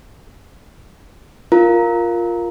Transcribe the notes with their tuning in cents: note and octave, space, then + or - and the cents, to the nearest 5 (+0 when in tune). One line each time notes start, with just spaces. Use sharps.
F4 +0 A#4 +0 A#5 +0